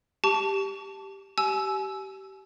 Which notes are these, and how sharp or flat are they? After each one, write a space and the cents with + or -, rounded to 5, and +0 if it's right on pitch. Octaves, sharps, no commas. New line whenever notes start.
G4 +0 A5 +0 C#6 +35
G4 -25 G#5 +35 E6 +0